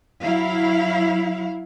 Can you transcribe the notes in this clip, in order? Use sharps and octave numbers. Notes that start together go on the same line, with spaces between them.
F#3 E4 F5